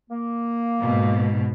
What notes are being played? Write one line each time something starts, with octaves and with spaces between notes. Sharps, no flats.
A#3
G#2 B2